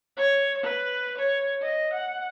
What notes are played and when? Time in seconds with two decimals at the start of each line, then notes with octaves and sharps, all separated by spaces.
0.17 C#5
0.64 B4
1.18 C#5
1.62 D#5
1.93 F#5